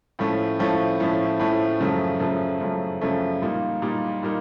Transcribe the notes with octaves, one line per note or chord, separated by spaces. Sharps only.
A2 F3 A3 C#4
A2 F3 A3 C#4
A2 F3 A3 C#4
A2 F3 A3 C#4
F#2 C#3 F3 A3
F#2 C#3 F3 A3
F#2 C#3 F3 A3
F#2 C#3 F3 A3
A#2 G3 A#3 D#4
A#2 G3 A#3 D#4
A#2 G3 A#3 D#4